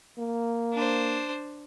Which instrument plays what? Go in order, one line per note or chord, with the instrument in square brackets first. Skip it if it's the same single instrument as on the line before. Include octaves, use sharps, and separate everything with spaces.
[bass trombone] A#3
[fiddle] D4 C5